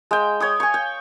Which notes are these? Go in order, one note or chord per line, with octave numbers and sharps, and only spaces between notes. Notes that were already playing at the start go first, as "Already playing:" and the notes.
G#3 G5
C#5 G5 D#6
G#5 C#6
G5